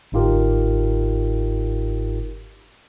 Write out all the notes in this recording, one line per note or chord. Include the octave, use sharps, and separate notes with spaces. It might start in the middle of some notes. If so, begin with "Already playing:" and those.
G1 G#2 D#4 F4 G4 A#4